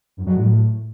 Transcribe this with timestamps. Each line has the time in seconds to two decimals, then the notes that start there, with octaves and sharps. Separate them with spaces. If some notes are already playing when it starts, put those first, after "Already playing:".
0.17 F#2
0.27 F#3
0.37 A2